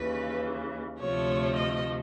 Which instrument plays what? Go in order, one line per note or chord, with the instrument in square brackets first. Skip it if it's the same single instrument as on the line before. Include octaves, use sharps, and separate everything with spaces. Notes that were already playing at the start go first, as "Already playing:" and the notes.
Already playing: [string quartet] D#2 C#3 E3 B4
D2 C3 F3 A3 C#5
D#5